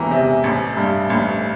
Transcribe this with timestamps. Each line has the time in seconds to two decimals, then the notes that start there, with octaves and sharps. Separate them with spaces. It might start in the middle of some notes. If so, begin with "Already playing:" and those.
Already playing: E1 E2 E3 A#5
0.11 C3
0.44 A1
0.77 G2
1.10 A1